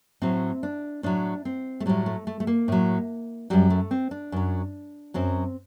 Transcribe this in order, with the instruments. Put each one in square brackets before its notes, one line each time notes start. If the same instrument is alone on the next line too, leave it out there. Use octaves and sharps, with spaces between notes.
[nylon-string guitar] A2 F#3 C4
D4
A2 F#3 D4
C4
A3
A2 F#3 G3
A3
A3
A3
A#3
A2 F#3
F#2 F#3 G3
A3
C4
D4
F#2 F#3
F#2 F#3 C4